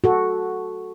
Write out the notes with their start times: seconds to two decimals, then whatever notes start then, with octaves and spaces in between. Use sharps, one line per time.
0.04 F#4 A4